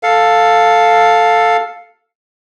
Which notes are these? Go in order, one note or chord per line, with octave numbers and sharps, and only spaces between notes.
A4 F5